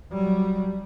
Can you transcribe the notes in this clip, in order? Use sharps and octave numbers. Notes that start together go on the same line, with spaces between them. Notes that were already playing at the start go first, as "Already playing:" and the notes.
F#3 G3